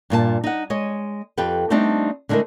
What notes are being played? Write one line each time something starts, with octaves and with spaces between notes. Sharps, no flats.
G2 A#2 F#4 A5
D#4 F#5
G#3 C#5 D#5
F2 G4 A4 B4 G5
G3 A3 B3 C4 D4 D#4
D3 G#3 A3 E4 A#4